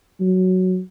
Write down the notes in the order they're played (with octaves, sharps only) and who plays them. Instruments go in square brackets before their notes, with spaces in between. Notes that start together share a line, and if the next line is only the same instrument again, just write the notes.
[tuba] F#3